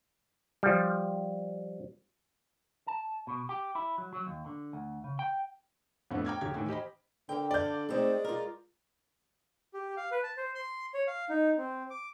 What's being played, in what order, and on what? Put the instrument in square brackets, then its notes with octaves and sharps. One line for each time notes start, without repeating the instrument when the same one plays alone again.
[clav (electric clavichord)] F3 G3
[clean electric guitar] A5
B2
G4
E4
F#3
F#3
D#2
D3
D2
C#3
G5
[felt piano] F2 A2 D3 F3 A3 B3
G5 A#5 D6 F6 G#6
D#1 C#3 G4 F6 G#6
A2 D#3 E3
G4 C5 D#5 B5
[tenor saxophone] D3 [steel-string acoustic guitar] A#4 G5
[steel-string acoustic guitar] A4 F5 [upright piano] D5 G6
[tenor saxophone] G#3 [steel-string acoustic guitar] A3 C4 D#4
[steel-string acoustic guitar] F4 A#4
[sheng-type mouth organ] G4
F5
B4
A5
C5
C6
C#5
F5
D#4
C4
D6